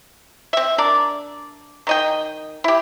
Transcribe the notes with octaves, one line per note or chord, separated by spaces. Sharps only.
C4 E5
D4 A#4 D5
D#3 D#5 G5
E4 G4